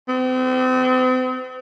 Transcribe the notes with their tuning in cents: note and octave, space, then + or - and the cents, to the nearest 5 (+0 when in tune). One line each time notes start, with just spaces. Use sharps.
C4 -40